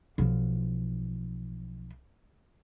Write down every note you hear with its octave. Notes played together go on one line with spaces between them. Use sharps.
B1 F3